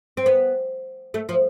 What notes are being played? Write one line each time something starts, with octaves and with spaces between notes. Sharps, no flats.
C4
B3
A3
F3